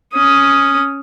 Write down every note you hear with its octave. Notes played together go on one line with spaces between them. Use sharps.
C#4 D#6